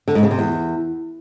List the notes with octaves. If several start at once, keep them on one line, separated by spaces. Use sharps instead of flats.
D3
G#2
C#3
C3
E2